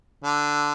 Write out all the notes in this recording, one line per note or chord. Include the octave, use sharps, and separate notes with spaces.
D3